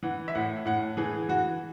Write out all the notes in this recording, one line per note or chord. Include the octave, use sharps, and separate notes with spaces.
E3 F#5
E5
A2 F#5
A2 F#5
E3 G#4
E3 F#4